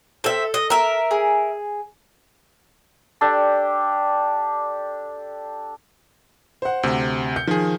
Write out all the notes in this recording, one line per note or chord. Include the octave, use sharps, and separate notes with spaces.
C4 A4 E5
D#5
A#4 E5
G#4
D4 G4 A4 D5
C5 F#5
D2 C3
G6 C#7
D#3 F3 G#4